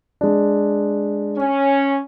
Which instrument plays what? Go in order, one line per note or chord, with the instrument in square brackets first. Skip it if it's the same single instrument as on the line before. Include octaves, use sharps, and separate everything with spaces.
[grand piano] G#3 D4
[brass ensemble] C#4